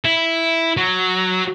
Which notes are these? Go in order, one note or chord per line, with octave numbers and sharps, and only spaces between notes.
E4
F#3